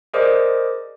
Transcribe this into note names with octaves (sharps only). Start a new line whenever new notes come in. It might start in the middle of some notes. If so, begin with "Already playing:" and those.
G#4 A#4 C5 D5 D#5 D6